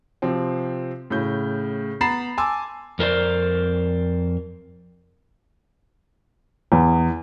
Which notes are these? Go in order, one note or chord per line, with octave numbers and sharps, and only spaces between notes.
C3 F3 C4
A2 C#3 G6
B3 A#5 B5 A6 C7 E7
G#5 A5 C6 D6 E6
F2 A#4 C5 D5
E2